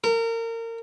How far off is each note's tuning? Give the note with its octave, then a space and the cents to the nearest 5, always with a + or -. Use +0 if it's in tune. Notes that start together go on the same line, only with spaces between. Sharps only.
A#4 -30